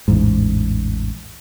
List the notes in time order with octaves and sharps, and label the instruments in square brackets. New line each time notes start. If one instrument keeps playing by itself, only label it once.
[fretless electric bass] A1 E2 G#2